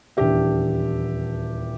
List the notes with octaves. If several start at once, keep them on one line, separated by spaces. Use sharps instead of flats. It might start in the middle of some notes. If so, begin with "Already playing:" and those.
D#1 E2 D4 G4 E5